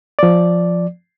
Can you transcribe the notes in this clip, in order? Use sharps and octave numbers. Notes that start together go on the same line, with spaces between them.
F3 D5